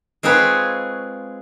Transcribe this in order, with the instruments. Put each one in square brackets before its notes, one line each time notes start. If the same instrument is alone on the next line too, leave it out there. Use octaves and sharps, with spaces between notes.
[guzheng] G#3 C4 F4 G#4 B4 C#5